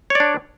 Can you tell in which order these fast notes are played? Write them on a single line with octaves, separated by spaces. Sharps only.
C#5 D5 D4